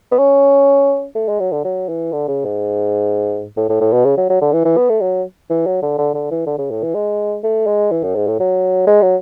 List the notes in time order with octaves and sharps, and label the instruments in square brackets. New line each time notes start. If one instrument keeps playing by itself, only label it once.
[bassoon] B3
C#4
A3
G#3
F#3
D3
F#3
E3
D3
C#3
G#2
A2
A2
A2
B2
C#3
F#3
F#3
D3
E3
E3
B3
A3
F#3
E3
F#3
D3
D3
D3
E3
D3
C#3
A2
E3
G#3
A3
G#3
E3
F#2
G#2
A2
F#3
G#3
F#3